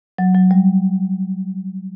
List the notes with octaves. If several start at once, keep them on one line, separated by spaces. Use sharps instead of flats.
F#3
F#3
G3